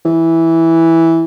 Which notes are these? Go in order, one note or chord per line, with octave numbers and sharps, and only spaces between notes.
E3